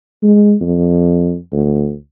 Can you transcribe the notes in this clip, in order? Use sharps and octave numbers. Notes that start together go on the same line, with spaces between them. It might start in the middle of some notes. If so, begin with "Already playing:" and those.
G#3
F2
D2